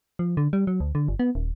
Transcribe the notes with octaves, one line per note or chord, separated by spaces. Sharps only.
F3
D3
G3
F#3
D2
D3
G1
B3
D#1